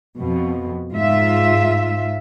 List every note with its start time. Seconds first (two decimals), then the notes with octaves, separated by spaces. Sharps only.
0.19 F2 B2
0.93 G#2 F4 E5